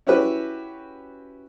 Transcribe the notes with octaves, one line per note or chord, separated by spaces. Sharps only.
C#4 E4 F#4 G4 B4